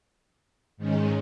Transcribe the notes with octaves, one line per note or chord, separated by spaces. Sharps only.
G#2 D#3 G#3 C#4